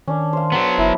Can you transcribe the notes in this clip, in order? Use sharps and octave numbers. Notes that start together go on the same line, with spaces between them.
D#3 C#4 D4 C#5
C5 F5
F#3 B3 A4 A#5
F#1 E4